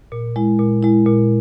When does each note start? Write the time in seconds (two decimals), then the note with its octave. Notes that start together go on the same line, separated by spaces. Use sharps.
0.12 A#2
0.36 G#3 E4
0.59 A#2
0.82 G#3 E4
1.06 A#2